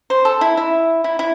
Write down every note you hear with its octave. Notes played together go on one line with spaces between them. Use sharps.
C5
A4
E4
E4
E4
E4